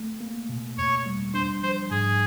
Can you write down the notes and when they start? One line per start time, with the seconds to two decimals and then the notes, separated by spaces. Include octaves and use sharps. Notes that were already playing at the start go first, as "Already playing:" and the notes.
Already playing: A3
0.21 A#3
0.49 B2
0.78 E2 C#5
1.06 G3
1.34 D4 C5
1.63 F3 C5
1.91 G#2 G#4